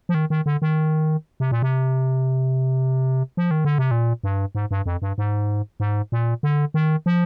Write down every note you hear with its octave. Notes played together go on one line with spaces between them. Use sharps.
F3
D#3
D#3
D3
D#3
C3
A#2
C3
F3
D#3
D3
C3
A#2
G2
G#2
G2
F2
G2
G#2
G#2
A#2
D3
D#3
F3